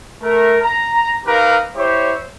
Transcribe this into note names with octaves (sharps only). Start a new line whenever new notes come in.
A3 A#4
A#5
D#4 G4 A#4 B4 F5 A#5
E4 G4 C5 C#5